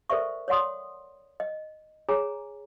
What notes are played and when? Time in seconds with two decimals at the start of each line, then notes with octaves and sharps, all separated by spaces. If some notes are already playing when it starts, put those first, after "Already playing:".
0.10 A4 A#4 C5 D5 E5 C#6
0.48 C#5 D5 F#5 C6 D#6
1.40 D#5
2.09 G#4 C#5 G#5 A#5